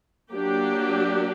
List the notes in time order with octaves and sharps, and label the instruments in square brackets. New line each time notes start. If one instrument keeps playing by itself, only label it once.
[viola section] F#3 A#3 D4 G4